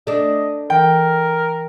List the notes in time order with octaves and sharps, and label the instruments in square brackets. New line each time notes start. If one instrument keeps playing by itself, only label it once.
[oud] A3 D4 [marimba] D5 [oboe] D#5
[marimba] E3 [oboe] A#4 [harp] G5